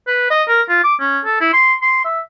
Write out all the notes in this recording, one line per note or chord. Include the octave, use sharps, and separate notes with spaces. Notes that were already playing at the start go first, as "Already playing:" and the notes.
B4
D#5
A#4
F4
D6
C#4
A4
E4
C6
C6
E5